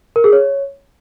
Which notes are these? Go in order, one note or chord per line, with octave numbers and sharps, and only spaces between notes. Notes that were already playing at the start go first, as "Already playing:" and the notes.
A#4
G#4
C#5